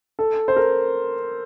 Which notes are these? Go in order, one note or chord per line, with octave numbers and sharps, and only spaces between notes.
A4
C5
A#4